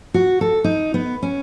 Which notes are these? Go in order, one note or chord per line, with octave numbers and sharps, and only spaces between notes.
F#4
A4
D#4
B3
C#4